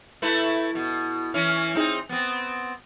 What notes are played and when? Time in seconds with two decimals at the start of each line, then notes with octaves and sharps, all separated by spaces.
0.22 A3 E4 B4
0.75 B2
1.34 E3 C#4
1.75 C4 D#4 G#4
2.09 B3 C4